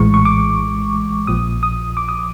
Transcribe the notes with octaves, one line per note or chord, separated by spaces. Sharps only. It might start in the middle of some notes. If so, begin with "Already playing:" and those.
Already playing: A#1 A2 E3 G#3 C#6
C#6
D6
A#1 A#2 F3 D#6
D#6
D6
D#6